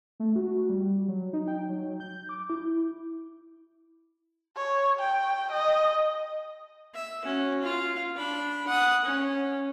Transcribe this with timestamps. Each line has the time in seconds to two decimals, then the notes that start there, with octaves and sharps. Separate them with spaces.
0.20 A3
0.36 F#4
0.69 G3
1.08 F#3
1.33 D#4
1.48 G5
1.69 F#3
2.00 G6
2.29 D6
2.50 E4
4.56 C#5
4.99 G5
5.52 D#5
6.94 E5
7.24 C#4 F#4
7.63 F4 F5
8.16 D4 B5
8.68 F#5 D#6
9.05 C#4